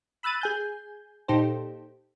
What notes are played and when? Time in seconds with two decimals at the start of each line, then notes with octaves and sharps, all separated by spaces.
0.23 B5 E6 F#6 A6 D#7
0.41 G#4 G#5 G6
1.28 A#2 D#4 G4 A4 C5